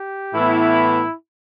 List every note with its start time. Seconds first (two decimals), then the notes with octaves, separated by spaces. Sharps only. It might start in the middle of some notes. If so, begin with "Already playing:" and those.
Already playing: G4
0.34 A2 E3 B3 E4